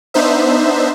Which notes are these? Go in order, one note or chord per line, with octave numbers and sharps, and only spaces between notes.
B3 D4 D#4 C5 E5